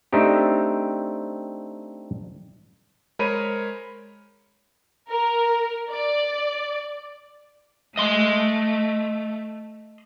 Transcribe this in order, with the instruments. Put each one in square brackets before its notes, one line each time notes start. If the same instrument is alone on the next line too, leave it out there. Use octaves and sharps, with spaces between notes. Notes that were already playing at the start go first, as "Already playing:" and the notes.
[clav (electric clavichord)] A3 C4 D4 D#4 G4
[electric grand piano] G#3 A#4 C5 C#5 B5 D#7
[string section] A#4
D5
[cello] A3 [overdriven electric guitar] D#5 C6